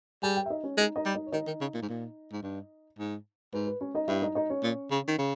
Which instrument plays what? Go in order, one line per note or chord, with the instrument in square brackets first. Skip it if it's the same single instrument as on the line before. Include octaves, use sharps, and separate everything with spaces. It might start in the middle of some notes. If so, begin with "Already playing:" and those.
[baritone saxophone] G3 [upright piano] G#4 G#5
[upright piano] G4 G5
E5
D#4 D#5
C#4 C#5
[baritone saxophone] G#3 [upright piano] D#4 D#5
[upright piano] D#4 D#5
[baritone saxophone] G3
[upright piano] D#4 D#5
C#5
[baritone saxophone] D#3 [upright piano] D#4 D#5
[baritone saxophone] D#3
C#3
A#2
G#2
A#2
G#2
G2
G#2
[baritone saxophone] G#2 [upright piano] B4
[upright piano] B4
C#4 C#5
D#4 D#5
[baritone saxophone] G2 [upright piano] E4 E5
[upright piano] D#4 D#5
D#4 D#5
C#4 C#5
[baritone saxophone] A#2
C#3
D#3
C#3